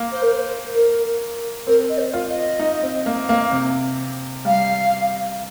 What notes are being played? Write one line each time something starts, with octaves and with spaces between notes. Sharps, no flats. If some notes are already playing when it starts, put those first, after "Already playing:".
Already playing: A#3
C5
A#4
C5
C5
A#4
C4 A#4
D#5
C5
F4
D#5
D#4
C4
A#3
A#3
C3
G3 F5